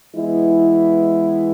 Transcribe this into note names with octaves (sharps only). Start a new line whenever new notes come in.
E3 G#3 B3 E4